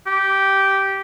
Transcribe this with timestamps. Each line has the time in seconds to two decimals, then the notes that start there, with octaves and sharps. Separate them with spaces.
0.07 G4